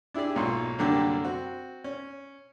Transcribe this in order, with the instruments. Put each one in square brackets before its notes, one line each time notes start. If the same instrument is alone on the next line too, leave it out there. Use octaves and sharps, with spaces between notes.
[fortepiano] D4 E4 G4 G#4 D5
B1 G#2 A#3 F4 C#5 C6
C2 F#2 D3 A#3 D4 G4
C4 F#4
C#4